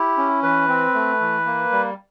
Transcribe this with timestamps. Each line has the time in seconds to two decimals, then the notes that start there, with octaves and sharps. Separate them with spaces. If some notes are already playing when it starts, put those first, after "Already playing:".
Already playing: E4 G4
0.17 C#4
0.43 E3 B4
0.69 C4
0.94 A3
1.21 E3
1.46 A#3
1.72 G3